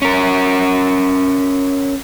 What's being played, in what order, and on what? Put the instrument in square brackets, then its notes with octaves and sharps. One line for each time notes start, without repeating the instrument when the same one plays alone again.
[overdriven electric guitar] C#4 A#4